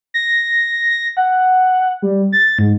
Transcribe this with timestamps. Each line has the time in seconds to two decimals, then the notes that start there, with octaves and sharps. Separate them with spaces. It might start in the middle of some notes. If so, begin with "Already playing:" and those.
0.14 A#6
0.89 A#6
1.17 F#5
2.02 G3
2.33 A6
2.59 G#2